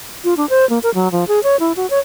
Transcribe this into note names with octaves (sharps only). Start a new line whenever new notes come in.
F4
D4
C5
A#3
A#4
F#3
F3
G#4
C#5
E4
F#4
C#5